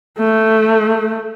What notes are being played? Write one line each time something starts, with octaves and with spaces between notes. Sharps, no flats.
A3